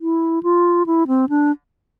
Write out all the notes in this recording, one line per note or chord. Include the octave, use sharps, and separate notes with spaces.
E4
F4
E4
C4
D4